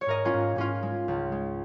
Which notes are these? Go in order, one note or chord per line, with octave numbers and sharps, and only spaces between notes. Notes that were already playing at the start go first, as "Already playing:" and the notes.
C#5
G#2 A#4 D#5
C#4 F4
G#2
G#2 C#4 F4
G#3
C#2
G#3